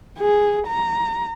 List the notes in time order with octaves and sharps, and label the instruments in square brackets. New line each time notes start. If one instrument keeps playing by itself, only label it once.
[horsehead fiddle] G#4
A#5